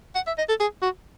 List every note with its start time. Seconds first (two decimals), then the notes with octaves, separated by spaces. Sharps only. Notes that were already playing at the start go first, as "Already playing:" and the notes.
0.15 F#5
0.27 E5
0.38 D#5
0.49 A4
0.60 G#4
0.82 F#4